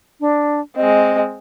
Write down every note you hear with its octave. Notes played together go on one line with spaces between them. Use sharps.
D4
G#3 C4 D#5